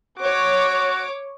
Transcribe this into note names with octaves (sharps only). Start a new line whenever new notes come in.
F#4 C#5 D6